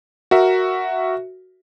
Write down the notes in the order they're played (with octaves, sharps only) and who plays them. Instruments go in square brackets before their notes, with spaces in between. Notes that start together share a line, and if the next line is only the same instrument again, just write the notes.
[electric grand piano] F#4 A#4 E5